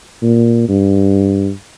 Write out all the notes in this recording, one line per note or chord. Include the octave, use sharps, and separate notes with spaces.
A#2
G2